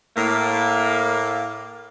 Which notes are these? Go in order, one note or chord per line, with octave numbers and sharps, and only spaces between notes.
A2 A#3